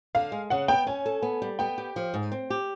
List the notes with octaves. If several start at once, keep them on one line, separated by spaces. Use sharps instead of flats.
D3 F5
G#3
C#3 F#5
B3 G5
C#4 G#5
A4
B3
G3
B3 G5
G4
F3
G#2
C4
G4